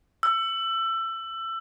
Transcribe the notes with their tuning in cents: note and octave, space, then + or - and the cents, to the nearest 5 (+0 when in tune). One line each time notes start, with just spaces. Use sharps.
E6 +25